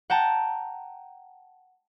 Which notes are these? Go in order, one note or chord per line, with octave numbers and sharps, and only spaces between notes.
F#5 G5 A5 A#5